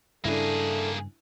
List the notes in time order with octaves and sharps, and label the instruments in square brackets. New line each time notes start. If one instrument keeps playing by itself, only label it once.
[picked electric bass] G2 C#3 [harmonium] A3 [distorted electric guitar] A#3 G#4 [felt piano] D4 E4